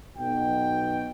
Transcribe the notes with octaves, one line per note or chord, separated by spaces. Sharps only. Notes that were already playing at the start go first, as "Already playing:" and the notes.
B1 B2 G5